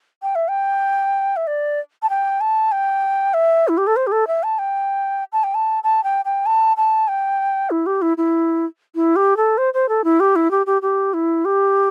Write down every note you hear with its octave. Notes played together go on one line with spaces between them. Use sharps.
G5
E5
G5
E5
D5
A5
G5
A5
G5
E5
E4
G4
A4
C5
G4
A4
E5
A5
G5
A5
G5
A5
A5
G5
G5
A5
A5
G5
E4
G4
E4
E4
E4
G4
A4
C5
C5
A4
E4
G4
E4
G4
G4
G4
E4
G4